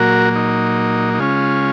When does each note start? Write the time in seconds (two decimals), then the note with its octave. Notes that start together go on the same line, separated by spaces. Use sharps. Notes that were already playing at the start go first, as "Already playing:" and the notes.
Already playing: A#2 F#3 A#3 F#4 A#4
0.35 D#4
1.14 D#4
1.19 C#3 G#3 C#4 F4